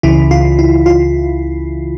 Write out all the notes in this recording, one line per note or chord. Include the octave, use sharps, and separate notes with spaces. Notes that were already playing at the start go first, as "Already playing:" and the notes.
C#2 C#3 E3 E4
F4
E4
F4